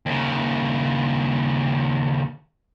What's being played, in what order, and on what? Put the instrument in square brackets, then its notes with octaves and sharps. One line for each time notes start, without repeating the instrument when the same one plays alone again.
[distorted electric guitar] D#2 C#3